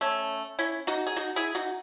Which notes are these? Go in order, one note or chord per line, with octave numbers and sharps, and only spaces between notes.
A3 C#4
C#4 E4
D#4 F#4
G#4
D#4 F#4
E4 G#4
D#4 F#4